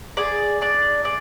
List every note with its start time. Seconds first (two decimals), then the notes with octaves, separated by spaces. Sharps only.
0.17 G#4 D5
0.61 D4 D5
1.04 G#4 D5